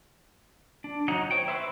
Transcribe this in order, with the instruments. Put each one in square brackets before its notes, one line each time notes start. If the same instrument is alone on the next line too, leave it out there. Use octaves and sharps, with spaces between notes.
[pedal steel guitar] D4
F#3 D#4 F#5
C5 C#5 G5
F#4 B4 C5 E5